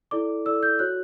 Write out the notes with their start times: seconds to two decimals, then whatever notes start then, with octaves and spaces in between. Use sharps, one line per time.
0.11 E4 A4 D5 D6
0.45 E4 A4 D5 E6
0.63 G6
0.79 F#4 C#5 F#6